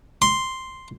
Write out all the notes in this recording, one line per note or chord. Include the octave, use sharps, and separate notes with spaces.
C6